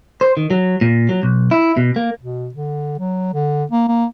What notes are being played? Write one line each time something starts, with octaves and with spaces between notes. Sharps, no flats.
C5
D#3
F#3
A#2
F#3
B1
E4
B2
A#3
B2
D3
F#3
D3
A#3
A#3